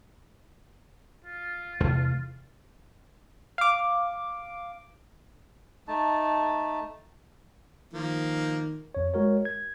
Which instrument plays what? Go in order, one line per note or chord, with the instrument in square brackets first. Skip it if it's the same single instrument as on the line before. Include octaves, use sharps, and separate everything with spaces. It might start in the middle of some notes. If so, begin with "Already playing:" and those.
[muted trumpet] F4
[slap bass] E2 A3 [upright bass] C3
[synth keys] F5 D6
[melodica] A3 D#4 A5
[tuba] D#3 [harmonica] F3 A#3
[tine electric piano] F2 C#5
G#3 F#4 A#4 C#5
G#6